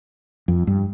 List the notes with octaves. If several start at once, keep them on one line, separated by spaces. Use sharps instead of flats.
F2
G2